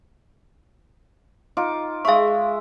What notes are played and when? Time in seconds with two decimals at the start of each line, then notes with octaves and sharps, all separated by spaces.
1.57 D#4 F4 D6
2.05 G#3 E5 F5 C#6